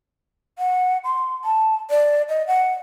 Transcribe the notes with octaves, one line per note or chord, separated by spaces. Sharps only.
F#5
C6
A5
D5
D#5
F#5